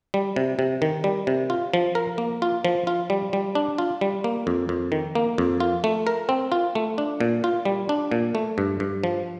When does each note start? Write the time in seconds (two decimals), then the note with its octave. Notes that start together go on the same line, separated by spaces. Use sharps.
0.14 G3
0.36 C3
0.59 C3
0.82 D#3
1.04 G3
1.27 C3
1.50 F4
1.74 F3
1.95 A#4
2.18 A#3
2.42 F4
2.65 F3
2.87 F4
3.10 G3
3.33 G3
3.55 D4
3.78 F4
4.01 G3
4.24 A#3
4.47 F2
4.69 F2
4.92 D#3
5.15 A#3
5.38 F2
5.60 F4
5.84 A3
6.07 A#4
6.29 C4
6.52 F4
6.75 A3
6.98 D4
7.20 A#2
7.44 F4
7.65 G3
7.89 D4
8.11 A#2
8.35 A3
8.58 G2
8.80 G2
9.04 F3